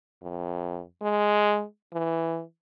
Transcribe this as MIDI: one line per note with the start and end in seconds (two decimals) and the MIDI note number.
0.23 0.81 41
1.02 1.64 56
1.93 2.42 52